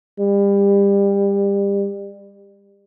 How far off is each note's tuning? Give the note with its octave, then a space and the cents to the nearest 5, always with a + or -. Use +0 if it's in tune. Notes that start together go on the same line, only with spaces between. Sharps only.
G3 +30